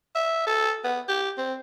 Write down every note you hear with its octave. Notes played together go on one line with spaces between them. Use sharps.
E5
A4
B3
G4
C4